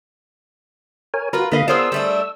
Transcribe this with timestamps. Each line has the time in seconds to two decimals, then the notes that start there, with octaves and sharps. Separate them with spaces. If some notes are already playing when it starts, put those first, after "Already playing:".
1.14 A#4 C#5 G#5
1.33 F4 F#4 A#4 B4
1.52 D3 G#3 A#3 B4 D#5 F5 B5
1.68 B3 D4 F4 G#4 A#4 C5 E6
1.92 G3 A3 D4